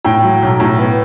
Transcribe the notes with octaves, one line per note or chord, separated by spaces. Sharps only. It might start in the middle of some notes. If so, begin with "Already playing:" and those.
A2 G5
F#3
B1
A2
B3